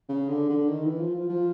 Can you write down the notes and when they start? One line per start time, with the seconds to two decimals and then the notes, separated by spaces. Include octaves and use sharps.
0.09 C#3
0.29 D3
0.49 D3
0.69 D#3
0.84 E3
0.99 F3
1.14 F3
1.29 F3